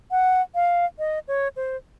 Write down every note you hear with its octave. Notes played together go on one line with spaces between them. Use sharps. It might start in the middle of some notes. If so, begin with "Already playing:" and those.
F#5
F5
D#5
C#5
C5